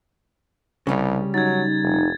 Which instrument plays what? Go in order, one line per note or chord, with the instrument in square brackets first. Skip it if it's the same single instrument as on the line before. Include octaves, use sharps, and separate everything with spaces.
[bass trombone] C2 [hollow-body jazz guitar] C#3 G3 C#4
[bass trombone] F#3 [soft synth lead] D#4 [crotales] G#6 A6
[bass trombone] F1